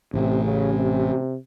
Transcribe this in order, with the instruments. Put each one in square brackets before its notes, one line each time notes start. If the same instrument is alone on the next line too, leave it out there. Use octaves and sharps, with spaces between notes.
[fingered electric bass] A1 A2 A3 [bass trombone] C3
[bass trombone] C#3
C3